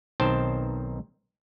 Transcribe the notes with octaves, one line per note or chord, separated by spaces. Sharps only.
B1 D#3 C4 C5 G5 A5